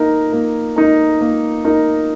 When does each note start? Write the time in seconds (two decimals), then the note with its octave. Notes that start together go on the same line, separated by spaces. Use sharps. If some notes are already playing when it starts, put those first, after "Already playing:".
Already playing: A#3 D#4 A#4
0.33 A#3
0.76 D#4 A#4
1.21 A#3
1.65 D#4 A#4